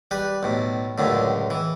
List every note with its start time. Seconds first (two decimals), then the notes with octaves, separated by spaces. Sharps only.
0.11 G3 B4
0.43 B1 A2
0.98 C#2 F#2 A2 D3
1.50 E3